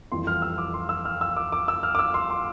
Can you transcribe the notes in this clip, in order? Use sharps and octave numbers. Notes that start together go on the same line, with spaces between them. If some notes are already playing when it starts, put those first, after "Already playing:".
F2 E3 G3 C6
F6
E6
D6
C6
E6
F6
E6
D6
D6
E6
F6
D6
E6
C6
C6